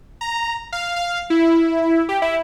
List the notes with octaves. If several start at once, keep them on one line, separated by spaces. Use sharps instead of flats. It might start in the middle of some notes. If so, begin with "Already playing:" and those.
A#5
F5
F5
E4
G4
E4